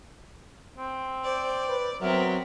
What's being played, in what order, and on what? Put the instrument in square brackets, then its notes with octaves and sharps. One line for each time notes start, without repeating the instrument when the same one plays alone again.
[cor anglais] C4
[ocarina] C5 [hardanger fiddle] D5
[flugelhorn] B4
[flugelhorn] F#3 [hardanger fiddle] B3 C4 [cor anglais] A#4 [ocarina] E5